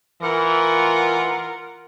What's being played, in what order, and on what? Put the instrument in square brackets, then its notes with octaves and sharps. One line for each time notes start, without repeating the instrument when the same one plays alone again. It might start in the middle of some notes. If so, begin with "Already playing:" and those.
[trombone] E3 [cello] F4 F#5 [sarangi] A#4